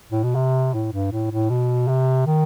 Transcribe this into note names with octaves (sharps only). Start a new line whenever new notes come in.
A2
B2
C3
A2
G2
A2
A2
B2
C3
D#3